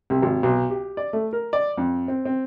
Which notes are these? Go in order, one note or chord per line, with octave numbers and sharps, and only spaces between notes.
C2
G#1
B1
G4
D5
A3
A#4
D5
F2
C4
C4